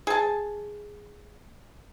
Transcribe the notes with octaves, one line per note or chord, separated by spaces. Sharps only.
G#4 A5